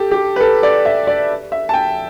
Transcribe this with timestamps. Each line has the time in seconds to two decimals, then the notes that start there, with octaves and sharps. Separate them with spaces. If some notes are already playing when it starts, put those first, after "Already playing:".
Already playing: G4 A4
0.11 G4
0.36 B4
0.40 A4
0.63 D5
0.85 E5
1.07 D5
1.52 E5
1.69 A5
1.74 G5